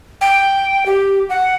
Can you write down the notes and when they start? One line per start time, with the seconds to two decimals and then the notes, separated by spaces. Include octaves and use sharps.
0.21 G5
0.86 G4
1.29 F#5